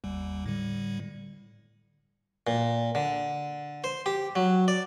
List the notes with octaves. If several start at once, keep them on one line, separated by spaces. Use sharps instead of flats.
G1 D#2 G3
A2 D3 G3
A#2
D3
C5
G4
F#3
D5